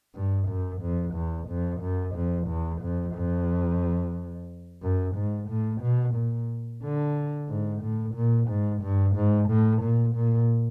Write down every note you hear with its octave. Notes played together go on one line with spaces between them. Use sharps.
G2
F#2
F2
E2
F2
F#2
F2
E2
F2
F2
F#2
G#2
A2
B2
A#2
D3
G#2
A2
A#2
G#2
G2
G#2
A2
A#2
A#2